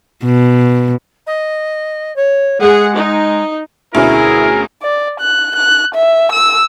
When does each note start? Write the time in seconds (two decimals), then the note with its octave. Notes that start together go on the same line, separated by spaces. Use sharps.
0.25 B2
1.27 D#5
2.16 C#5
2.61 G#3 G#4 F#5
2.95 D#4
3.95 D2 B2 C#4 E4 G#4 A#4
4.82 D5
5.20 F#6
5.55 F#6
5.95 E5
6.32 E6